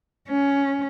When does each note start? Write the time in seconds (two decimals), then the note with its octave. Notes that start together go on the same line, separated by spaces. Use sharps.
0.29 C#4